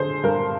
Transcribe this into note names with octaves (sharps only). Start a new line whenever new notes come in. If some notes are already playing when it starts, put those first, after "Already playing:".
Already playing: D3 G#4 C5
G2 A#4